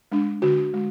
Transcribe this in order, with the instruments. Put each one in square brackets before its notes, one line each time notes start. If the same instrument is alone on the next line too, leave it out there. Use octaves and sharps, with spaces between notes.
[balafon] G#3 D4
D3 F#4
G#3